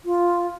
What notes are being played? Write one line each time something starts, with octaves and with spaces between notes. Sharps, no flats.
F4